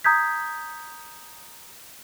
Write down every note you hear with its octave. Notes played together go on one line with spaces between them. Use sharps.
A#5 D#6 G6 G#6 B6